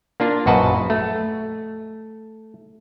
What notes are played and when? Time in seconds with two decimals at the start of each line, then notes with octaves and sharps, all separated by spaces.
0.20 A#3 D4 F4
0.46 A#1 F#2 F#4 B4 D#5 A5
0.90 A3